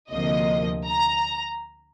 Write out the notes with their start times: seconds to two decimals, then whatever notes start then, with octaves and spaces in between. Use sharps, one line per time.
0.11 D2 C3 F3 A#3 D#5
0.87 A#5